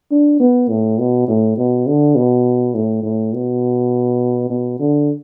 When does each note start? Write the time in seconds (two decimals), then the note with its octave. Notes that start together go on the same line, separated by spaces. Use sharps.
0.11 D4
0.40 B3
0.69 A2
0.99 B2
1.28 A2
1.57 B2
1.86 D3
2.15 B2
2.74 A2
3.03 A2
3.33 B2
4.50 B2
4.79 D3